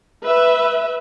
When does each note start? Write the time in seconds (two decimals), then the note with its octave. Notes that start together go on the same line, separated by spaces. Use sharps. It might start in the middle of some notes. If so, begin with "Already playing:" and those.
0.25 B4 E5